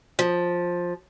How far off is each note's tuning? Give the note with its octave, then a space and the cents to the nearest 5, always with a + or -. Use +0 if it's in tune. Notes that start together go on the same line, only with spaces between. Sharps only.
F3 +10